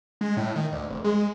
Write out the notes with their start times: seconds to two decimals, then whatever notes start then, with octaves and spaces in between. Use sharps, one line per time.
0.21 G#3
0.37 A2
0.55 D#3
0.72 D2
0.90 F1
1.04 G#3